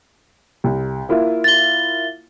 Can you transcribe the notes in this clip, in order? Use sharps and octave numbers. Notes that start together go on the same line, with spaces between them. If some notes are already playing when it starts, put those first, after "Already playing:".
C2
A#3 E4 F4
A6 G7